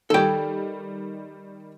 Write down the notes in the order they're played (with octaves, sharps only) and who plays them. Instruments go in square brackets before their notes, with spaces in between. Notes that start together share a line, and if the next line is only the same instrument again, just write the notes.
[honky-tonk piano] D#3 G3 [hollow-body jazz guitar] A4 G5